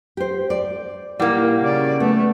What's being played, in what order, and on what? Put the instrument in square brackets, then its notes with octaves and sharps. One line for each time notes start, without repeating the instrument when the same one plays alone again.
[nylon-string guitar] G4 C5
D5
[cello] A#2 [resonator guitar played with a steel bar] G3 A#3 [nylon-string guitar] D#4 [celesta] E4 F#5
[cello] C#3 D5
[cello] A3 [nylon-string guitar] B3